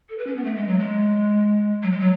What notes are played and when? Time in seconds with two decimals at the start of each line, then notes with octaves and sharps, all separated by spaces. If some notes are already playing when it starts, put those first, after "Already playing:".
0.09 A4
0.18 B4
0.27 C#4
0.36 B3
0.44 A3
0.56 G#3
0.68 F#3
0.79 G#3
1.83 F#3
1.92 G#3
2.00 F#3